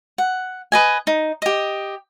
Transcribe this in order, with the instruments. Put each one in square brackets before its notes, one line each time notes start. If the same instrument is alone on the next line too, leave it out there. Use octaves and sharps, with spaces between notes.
[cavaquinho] F#5
B4 D#5 G#5
D#4
G4 D#5